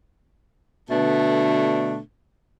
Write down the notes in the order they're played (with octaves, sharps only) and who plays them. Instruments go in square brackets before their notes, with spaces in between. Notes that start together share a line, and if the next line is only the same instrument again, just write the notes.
[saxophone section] B2 D3 A3 B3 D4